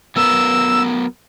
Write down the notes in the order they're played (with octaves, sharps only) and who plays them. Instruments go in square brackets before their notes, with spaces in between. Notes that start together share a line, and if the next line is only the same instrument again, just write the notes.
[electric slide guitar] F#3 B3 A#4 [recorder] E6